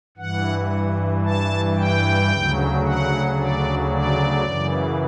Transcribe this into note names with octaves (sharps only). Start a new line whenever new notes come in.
G2 E3 F#5
A5
G5
D2 C#3 F#3
F#5
D5
D5
F#2 C#3 E3